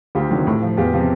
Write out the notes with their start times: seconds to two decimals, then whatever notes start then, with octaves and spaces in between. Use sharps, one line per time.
0.15 D2 F4 G4
0.31 C3 D#3 F#3
0.47 A2
0.62 F3
0.77 E2 F4 G4
0.93 C3 F3